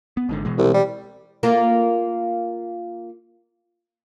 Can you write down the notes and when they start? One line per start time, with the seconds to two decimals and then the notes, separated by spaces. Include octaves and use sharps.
0.17 B3
0.29 G#1 G#2 D3
0.45 B2 E3 G#3
0.58 C2
0.74 G3
1.43 A#3 F4 A#4